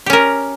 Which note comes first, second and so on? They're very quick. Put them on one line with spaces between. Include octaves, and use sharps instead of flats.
G4 C#4 A#4